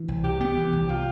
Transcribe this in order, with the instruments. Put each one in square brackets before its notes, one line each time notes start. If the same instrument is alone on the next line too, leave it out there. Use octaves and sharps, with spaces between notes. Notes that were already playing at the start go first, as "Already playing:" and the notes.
Already playing: [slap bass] E3
C2
[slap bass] C3 [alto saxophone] G4
[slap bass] B3 [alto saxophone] G4
[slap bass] E3
C2
[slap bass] C3 [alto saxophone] F4